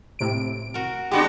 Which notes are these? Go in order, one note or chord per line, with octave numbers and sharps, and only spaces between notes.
A2 C3 D7
F#4 A#4
G#3 B3 C4 D4 F#4 G4